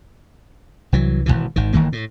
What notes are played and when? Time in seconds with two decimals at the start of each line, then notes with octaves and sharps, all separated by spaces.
0.92 C2 E3 F#3
1.26 G#1 C#2 B2 E3
1.56 G#1 D#3
1.73 G1 D#3 E3 A#3
1.93 A2